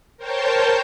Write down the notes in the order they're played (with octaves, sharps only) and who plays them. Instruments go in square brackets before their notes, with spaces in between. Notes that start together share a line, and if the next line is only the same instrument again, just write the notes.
[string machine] A#4 C5 C#5 G5 A5 G6